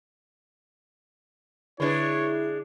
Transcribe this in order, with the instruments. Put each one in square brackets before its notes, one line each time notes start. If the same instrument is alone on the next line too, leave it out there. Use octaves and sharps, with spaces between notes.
[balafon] D3 G#4 B4 [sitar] G#3 D4 [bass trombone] E4 [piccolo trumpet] C#5